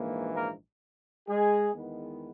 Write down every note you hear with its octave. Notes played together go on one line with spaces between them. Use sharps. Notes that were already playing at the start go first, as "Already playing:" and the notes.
Already playing: A#1 G#2 E3 A#3
A#3 A#4
G#3 G#4
E2 D#3 G#3 B3